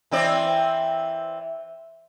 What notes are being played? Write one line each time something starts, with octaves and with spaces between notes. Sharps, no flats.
E3 C4 D5